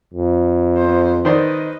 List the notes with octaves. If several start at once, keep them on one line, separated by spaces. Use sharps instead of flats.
F2
B3 C5
D#3 B4 C5 D5 D#5